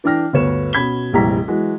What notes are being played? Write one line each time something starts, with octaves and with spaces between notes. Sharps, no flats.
E3 D4 G5 F6 A#6
G1 D2 B4 C#5 E7
B2 C#4 B5 G#6 B6 G7
F1 A#1 E3 G3 A#5 B6
E3 F#3 G#3 F#4